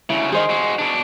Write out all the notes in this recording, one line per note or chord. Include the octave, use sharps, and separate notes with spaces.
D2 C#3 E4 C#5
D#3 G#4 C5 D#5
G#3 F#4
B2 D4